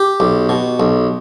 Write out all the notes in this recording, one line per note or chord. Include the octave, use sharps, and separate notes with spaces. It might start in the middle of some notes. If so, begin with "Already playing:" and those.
Already playing: G4
B1
B2
B1